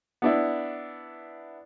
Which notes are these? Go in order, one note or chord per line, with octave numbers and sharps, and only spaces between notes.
B3 D4 E4